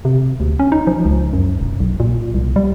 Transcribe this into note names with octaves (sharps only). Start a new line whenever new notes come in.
C3
D2
C#4
D#4
F3
C#2
F#2
E1
B1
A#2
C2
G3